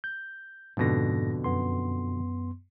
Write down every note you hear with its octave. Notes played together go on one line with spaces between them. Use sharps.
G6
F2 G#2 B2 D3 A#6
F#2 B3 C6